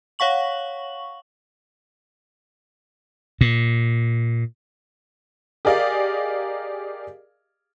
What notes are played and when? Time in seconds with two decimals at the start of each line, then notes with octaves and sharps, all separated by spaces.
0.19 C#5 F5 F#5 C#6 F#7
3.41 A#2
5.65 G4 G#4 A#4 D5 D#5 F5